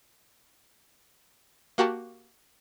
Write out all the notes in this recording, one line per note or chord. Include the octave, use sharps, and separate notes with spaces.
A#3 F#4 G4 A5